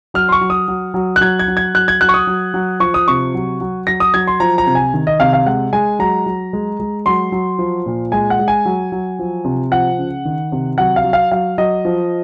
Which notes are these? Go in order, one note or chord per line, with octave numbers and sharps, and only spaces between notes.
F#3 F6
C6
C#6
F#3
D#6
F#3
F#3
F#6
F#3 G#6
G#6
F#3
G#6
F#3 F#6
G#6
F#3 F#6
C#6
D#6
F#3
F#3
F3 C#6
D#6
C3 C#6
F#3
F#3
F#3 A#6
D#6
F#3 G#6
C6
F3 A#5
A#5
C3
G#5
D#3
D#5
C3 F5
F5
G#3 F#5
G#3 G#5
F#3 A#5
F#3
G#3
G#3
F#3 C6
F#3
F3
A#2
G#3 G#5
F#5
G#3
G#5
F#3
F#3
F3
C3
F3 F#5
C#3
D#3
C3
F#3 F#5
F5
F#3
F5
F#3 F5
F#3 D#5
F3